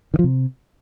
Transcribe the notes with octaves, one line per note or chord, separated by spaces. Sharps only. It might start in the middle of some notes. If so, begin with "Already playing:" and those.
D#3
F3
C3